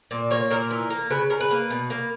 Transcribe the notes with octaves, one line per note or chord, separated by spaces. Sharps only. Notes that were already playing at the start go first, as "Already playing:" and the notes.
A#2
A#3 C#5
A#2 A#4
E3
A#3
C#3 B4
C#3 A#4
B4
A#3
B2
A#3